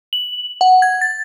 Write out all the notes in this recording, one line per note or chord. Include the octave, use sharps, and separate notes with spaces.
F#7
F#5
G#6
A6